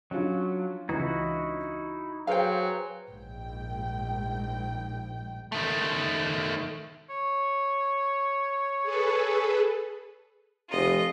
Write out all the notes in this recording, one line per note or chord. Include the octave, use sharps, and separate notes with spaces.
F#3 C#4 D4 F4
C#2 E3 D#4 E4 F#4
F#3 G#4 B4 C5 F5 G5
A#1 G#2 G5
D#3 A3
C#5
G#4 A4 B4
F1 F4 D#5